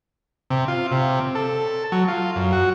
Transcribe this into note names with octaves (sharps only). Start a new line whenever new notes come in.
C3
F4
C3
A4
F#3
F4
F#2
F#4